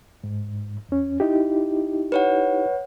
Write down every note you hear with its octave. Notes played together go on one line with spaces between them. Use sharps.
G#2
E2 C#4
D#4 E4 G4
B4 C#5 F#5